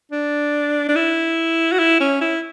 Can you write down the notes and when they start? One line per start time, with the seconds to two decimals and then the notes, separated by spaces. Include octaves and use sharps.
0.12 D4
0.89 D4
0.96 E4
1.72 F#4
1.79 E4
2.00 C#4
2.21 E4